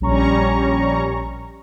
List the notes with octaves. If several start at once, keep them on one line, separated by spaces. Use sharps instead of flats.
A#1 G3 C#4 A#5 C#6